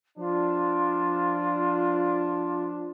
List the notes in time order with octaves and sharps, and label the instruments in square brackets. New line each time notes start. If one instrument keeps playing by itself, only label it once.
[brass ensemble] F3 D4 [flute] F4